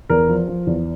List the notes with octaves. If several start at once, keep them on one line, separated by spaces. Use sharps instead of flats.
E2 A#4
F3
F3
E2